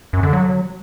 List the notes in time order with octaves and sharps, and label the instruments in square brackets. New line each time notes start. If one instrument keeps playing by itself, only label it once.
[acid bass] F#2
D3
F#3